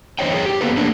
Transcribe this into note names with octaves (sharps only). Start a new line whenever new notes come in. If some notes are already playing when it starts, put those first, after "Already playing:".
E2 G3 C5 C#5 D#5 G5
G#4 C#5 G5
G4
A#3 B3 G4 A4 B4
A3 A#3 D4